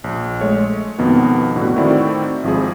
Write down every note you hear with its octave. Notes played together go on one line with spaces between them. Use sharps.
A#1
G#3 A3 C#5
F2 B2 D#3 A#3 B3
A2 D3 B3 F#4
D#3 A3 C4 E4 F#4 D5
G#1 F3 C4 G#4